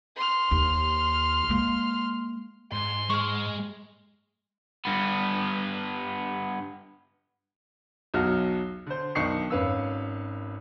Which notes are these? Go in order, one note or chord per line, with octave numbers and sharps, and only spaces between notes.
C6 F6
D#2
G#3 A#3
G#2 C6
G#3 C#6 F6
G2 B3
B1 E2 F#3 F#4 A5 F6
D3 C5
B1 D#3 D4 C#6 C7 C#7
G#1 C#4 B4 F5 E6